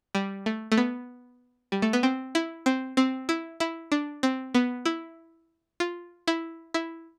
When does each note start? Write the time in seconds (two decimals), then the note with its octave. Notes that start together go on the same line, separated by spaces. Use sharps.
0.15 G3
0.46 A3
0.72 A3
0.78 B3
1.72 G3
1.82 A3
1.93 B3
2.03 C4
2.35 E4
2.66 C4
2.97 C4
3.29 E4
3.60 E4
3.92 D4
4.23 C4
4.54 B3
4.85 E4
5.80 F4
6.28 E4
6.74 E4